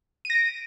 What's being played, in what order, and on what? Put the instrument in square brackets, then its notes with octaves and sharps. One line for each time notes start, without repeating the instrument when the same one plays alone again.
[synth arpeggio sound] D#7
A#6
D7